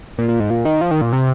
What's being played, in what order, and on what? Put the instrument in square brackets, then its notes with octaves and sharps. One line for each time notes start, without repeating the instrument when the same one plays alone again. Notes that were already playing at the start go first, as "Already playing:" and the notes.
[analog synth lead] A#2
A#2
G#2
A#2
D#3
F3
D#3
A#2
C3